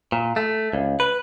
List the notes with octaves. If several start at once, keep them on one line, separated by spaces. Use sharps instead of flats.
A#2
A3
C#2
B4